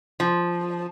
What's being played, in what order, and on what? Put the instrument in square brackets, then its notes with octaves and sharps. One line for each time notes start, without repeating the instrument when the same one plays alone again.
[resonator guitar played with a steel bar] F3